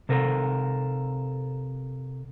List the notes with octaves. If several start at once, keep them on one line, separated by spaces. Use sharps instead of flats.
C3 A4 A#4